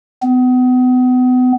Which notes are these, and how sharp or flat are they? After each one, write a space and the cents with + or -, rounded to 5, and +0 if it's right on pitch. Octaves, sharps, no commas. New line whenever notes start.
B3 +35